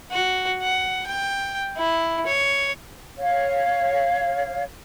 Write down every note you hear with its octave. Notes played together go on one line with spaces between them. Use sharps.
F#4
F#5
G5
E4
C#5
C#5 F5